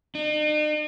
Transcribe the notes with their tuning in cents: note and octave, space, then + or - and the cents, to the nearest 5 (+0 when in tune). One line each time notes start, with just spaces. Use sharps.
D#4 -45